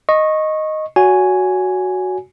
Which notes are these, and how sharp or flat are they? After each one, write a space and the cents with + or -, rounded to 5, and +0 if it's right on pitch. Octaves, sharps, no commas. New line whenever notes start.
D#5 +0 C#6 -20
F#4 +0 C#5 +40 G#5 +0